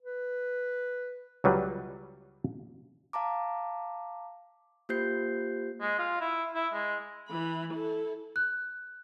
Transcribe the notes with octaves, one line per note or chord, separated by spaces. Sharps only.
B4
C#2 F#3 G3 B4
F5 A5 A#5 D6
A#3 F4 G4 C5 G6 C7
G#3
F4
E4
E4
G#3
E3 B5
E4 A4
F#6